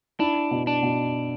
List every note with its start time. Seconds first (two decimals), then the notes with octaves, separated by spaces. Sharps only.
0.20 D4 E4
0.51 B2
0.67 D4
0.83 B2